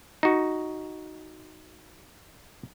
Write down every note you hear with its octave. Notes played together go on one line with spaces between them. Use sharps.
D#4 F#4